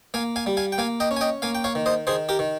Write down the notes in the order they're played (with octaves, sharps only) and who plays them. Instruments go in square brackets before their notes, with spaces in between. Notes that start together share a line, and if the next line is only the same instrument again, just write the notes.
[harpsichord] A#3 F5 G#5
F5 G#5
G3
F5 G#5
G5
A#3 F5 G#5
D#5 G5
C#4
G#5
D#5 G5
A#3 F5 G#5
G5
C#5 F5
D#3
C5 D#5
D#3 G#4 C5
G4 A#4
D#3